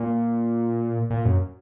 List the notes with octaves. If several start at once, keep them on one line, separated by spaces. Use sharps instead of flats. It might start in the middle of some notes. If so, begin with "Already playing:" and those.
Already playing: A#2
A#2
F#2